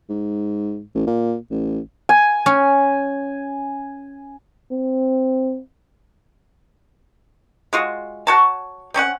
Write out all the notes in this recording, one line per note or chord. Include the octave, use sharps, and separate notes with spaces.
G#2
A1
A#2
A1
G#5
C#4
C4
G#3 F4 F#4
F#4 C#5 A5
C4 C#4 C#5 F#5